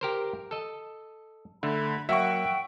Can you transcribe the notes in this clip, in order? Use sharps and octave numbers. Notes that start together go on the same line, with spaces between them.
G4 A#4 C5
A4 D#5
D3 A3 B5
F#3 A#3 F#4 E5 F#5 G5 C#6